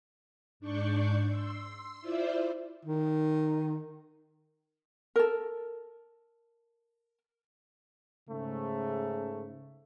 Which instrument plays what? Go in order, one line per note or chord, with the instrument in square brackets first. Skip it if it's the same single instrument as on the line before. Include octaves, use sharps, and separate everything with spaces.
[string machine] G#2 D4 D5 C#6 G6
C6 E6
E4 F4 C5 D5 E5
[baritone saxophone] D#3
[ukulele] A4 A#4
[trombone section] G#2 A3 [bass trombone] C#3